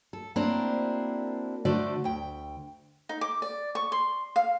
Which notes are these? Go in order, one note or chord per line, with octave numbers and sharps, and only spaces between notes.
A4
A#3 C4 D4 E4 F#4 C5
D3 A3 F#4 C5 D5
D2 G5
D#4
D6
D5
C#6
C6
F5